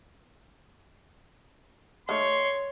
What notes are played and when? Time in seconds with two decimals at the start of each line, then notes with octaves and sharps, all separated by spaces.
2.09 D#3 A3 C#5 C6